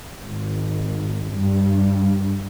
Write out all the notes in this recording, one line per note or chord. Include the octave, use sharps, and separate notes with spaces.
G#1
G2